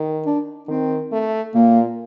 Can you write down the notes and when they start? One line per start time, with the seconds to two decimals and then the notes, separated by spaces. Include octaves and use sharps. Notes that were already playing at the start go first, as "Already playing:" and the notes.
Already playing: D#3
0.26 D4
0.68 D#3 C4
1.12 A3
1.55 A#2 A#3